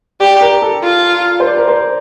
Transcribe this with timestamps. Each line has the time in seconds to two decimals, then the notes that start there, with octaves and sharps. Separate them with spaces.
0.20 G4 D5
0.41 A#4
0.62 A4
0.83 F4
1.40 C5
1.46 D5
1.57 A#4
1.68 C5
1.78 D5